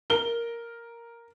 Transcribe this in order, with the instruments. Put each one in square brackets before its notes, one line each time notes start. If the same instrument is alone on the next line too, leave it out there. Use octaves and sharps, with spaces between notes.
[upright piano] A#4 G7